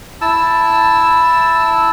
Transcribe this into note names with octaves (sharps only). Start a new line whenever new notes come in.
E4 A5 E6